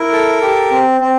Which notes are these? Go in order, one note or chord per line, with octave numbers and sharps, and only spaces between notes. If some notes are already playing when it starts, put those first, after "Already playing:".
Already playing: E4 A#4
A4
G4
C4
C4